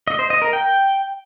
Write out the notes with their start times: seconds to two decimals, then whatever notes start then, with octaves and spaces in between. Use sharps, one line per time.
0.08 D#5
0.19 C5
0.30 D#5
0.42 A#4
0.53 G5